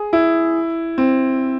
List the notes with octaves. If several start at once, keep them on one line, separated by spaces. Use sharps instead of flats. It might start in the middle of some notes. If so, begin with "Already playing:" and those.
Already playing: G#4
E4
C4